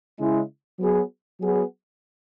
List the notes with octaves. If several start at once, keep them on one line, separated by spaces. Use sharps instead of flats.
C#3 G#3 E4
F#3 B3 G#4
F#3 B3 G#4